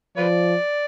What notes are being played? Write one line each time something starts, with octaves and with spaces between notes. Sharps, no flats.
F3 F4 B4 D5